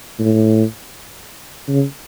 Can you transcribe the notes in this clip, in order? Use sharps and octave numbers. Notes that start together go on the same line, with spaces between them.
A2
C#3